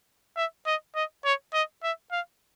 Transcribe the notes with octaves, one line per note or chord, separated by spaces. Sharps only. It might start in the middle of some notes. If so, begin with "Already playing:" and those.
E5
D#5
D#5
C#5
D#5
E5
F5